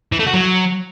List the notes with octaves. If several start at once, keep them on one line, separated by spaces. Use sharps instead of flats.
E3
A3
F#4
F#3